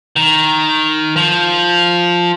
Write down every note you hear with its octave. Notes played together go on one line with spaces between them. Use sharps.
D#3
F3